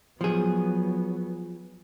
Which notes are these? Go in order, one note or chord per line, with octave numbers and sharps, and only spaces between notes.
F3 F#3 B3 G#4